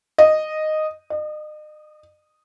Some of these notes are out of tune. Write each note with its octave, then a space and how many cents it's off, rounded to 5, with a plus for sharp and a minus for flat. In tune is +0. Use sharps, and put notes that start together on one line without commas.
D#5 -5
D#5 -40